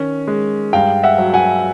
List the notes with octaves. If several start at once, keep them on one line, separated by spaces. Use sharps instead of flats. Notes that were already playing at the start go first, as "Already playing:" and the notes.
Already playing: D#3 C#4
G#3
G2 F5 G5
E5 F#5
F#3
F#5 G#5